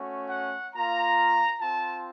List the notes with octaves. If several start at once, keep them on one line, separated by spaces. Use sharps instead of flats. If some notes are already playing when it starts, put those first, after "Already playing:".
Already playing: A3 C#4 F#4
F#5
A#3 F4 A#5
C4 F4 A5